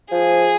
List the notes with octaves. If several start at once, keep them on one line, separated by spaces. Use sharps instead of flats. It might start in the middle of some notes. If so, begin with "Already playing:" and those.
F3 G#4